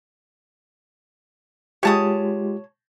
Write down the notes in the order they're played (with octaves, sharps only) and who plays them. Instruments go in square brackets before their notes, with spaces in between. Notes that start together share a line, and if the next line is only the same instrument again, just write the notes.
[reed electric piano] G#3 F4 G4 [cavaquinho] C#5 A5 D#6